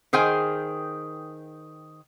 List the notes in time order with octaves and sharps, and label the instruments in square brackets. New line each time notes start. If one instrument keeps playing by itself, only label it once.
[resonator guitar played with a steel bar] D#3 G#4 C5 G5 G#5